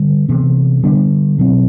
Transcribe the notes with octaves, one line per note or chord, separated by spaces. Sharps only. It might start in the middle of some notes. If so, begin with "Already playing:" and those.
Already playing: D3 G3
C3 E3 B3
D3 G3 B3 D4
B2 F#3 C4